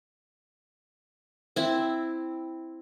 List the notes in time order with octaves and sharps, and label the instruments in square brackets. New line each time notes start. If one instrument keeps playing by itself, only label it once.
[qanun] C4 E4